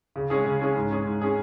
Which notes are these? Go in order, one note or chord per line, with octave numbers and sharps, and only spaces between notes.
C#3
G#3 C#4 G#4
C#3
G#3 C#4 G#4
G#2
G#3 C#4 G#4
G#2
G#3 C#4 G#4